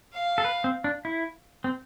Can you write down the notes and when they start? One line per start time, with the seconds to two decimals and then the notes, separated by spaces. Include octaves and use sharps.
0.15 F5
0.38 A4
0.44 B4
0.64 C4
0.84 D4
1.05 E4
1.64 C4